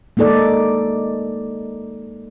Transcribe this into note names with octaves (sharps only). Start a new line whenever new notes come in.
G#3 A#3 D#4 A4 D5